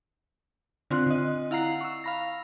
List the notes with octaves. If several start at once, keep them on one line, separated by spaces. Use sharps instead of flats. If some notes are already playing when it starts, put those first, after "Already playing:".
D3 C4 F4 C6 F#6
D3 D#5
E4 F5 F#5 A#5 C7
C#6 E6
F5 B5 A#6